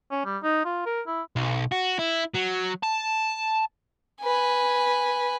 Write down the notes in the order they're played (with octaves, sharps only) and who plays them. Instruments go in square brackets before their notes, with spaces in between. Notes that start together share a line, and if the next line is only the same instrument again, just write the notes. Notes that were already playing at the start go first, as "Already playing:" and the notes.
[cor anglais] C#4
G3
D#4
F4
A#4
E4
[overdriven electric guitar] B1
F#4
E4
F#3
A5
[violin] B4 G#5